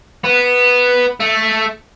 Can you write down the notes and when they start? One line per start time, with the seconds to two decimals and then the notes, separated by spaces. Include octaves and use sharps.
0.24 B3
1.20 A3